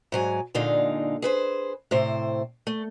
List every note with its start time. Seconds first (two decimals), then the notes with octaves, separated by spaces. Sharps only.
0.12 G#2 F#3 G#5
0.55 A#2 D3 G#3 D#4 F5
1.22 G#4 B4 C5
1.91 A2 C3 C5
2.67 A3